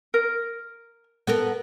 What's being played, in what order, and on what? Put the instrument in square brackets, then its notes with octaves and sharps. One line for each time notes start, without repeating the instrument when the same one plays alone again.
[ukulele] A#4
[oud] B3 A4 A#4